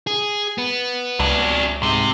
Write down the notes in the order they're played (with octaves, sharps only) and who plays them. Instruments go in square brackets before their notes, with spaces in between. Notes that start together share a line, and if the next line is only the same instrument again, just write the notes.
[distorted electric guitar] G#4
B3
[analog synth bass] C#2 [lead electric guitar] F#3 D4
[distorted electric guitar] G#2 [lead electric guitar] C3